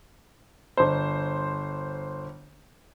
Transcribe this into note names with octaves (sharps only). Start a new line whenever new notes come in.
G1 C5